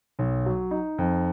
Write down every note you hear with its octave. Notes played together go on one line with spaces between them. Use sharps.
B1
F#3
D#4
F2